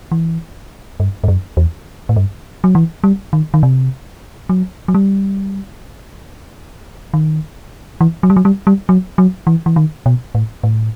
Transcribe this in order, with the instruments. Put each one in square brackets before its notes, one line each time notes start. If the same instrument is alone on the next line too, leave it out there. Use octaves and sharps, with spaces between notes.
[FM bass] E3
G2
G2
F#2
E2
A2
G2
F#3
E3
G3
D#3
D#3
C3
F#3
F#3
G3
D#3
E3
F#3
G3
F#3
G3
G3
F#3
F#3
E3
E3
D#3
B2
A2
A2